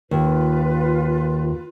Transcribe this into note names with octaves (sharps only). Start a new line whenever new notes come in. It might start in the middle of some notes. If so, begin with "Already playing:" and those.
D#2 F4 B4